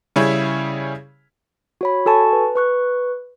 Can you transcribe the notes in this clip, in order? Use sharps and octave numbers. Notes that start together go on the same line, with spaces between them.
C#3 G3 C#4 E4 G#4 C#5
F#4 C#5 B5
F#4 A4 G#5 A5 C#6
B4
B4 C#6 F#6